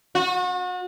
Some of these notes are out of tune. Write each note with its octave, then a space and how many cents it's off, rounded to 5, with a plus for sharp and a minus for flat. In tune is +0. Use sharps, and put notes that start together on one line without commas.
F#4 -35